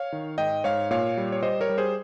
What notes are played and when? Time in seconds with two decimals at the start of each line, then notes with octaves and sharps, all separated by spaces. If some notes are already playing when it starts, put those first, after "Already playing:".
Already playing: C#5 F5
0.12 D#3
0.38 G#2 D#5 G5
0.64 G#2 C#5 F5
0.91 A#2 C#5 F5
1.17 G3
1.32 C#5
1.43 G3 C5 D#5
1.61 A#4 C#5
1.69 G3
1.78 G#4 C5